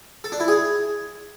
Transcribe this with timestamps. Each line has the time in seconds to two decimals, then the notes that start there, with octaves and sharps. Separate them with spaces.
0.24 A4
0.32 D4
0.40 E4
0.48 G#4